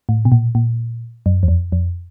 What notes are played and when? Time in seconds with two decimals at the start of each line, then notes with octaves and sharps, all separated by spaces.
0.09 A2
0.25 B2
0.32 A#2
0.55 A#2
1.26 F#2
1.43 E2
1.48 F2
1.72 F2